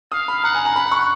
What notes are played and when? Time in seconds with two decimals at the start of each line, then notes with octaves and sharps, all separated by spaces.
0.12 F5 D#6
0.28 B5
0.44 F#5 A#5
0.55 G#5
0.65 A#5
0.76 B5
0.86 B5
0.91 C#6